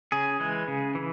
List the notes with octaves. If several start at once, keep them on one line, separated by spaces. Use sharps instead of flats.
C#3 G#4
E3 G#3
C#3
E3